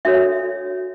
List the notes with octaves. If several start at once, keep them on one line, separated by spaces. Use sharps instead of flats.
D4 F#4 A4 C#5 E5